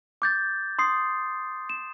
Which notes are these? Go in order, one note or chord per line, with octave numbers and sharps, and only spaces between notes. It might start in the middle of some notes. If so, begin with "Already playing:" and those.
D6 G6 A6
C6 D#6 C7
E7